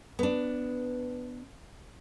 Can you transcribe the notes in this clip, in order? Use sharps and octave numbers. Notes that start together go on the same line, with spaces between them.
B3 D4